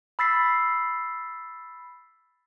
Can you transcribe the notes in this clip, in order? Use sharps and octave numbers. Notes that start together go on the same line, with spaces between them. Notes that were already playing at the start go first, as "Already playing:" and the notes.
B5 E6 A6 B6 C7